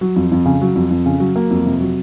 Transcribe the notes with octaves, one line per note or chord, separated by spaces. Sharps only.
F#3
F2
F2
C#3
F#3
F2
F2
C#3
F#3
A#3
F2
C3
F#3